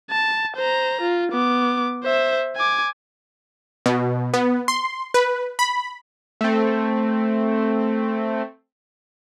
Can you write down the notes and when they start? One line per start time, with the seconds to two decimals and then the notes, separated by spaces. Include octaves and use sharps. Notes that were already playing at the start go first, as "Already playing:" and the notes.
0.11 A5
0.56 C5 A#5
1.01 F4
1.32 B3 D6
2.03 C5 E5
2.56 G#5 D6
3.86 B2
4.34 B3
4.68 C6
5.14 B4
5.59 B5
6.41 A3 C4